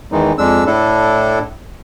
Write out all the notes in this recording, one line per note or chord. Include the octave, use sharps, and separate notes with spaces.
E2 D#3 E3 G#3 D#4
F2 G#3 D4 E6
A2 D4 E4 A4